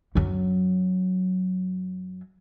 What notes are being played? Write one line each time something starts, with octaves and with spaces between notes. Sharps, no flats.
F#2 F#3